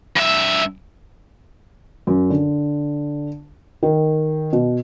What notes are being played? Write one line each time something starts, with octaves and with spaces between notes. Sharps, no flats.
G2 E5
F#2
D3
D#3
B2